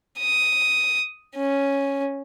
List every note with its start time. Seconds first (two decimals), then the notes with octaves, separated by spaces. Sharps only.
0.19 D#6
1.37 C#4